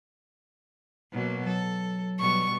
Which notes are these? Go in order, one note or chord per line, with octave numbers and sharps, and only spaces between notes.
B2 F#3 A#3
F#3 A4
B2 G3 C#6